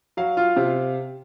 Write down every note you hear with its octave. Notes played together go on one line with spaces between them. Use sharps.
F#3 F5
F4
C3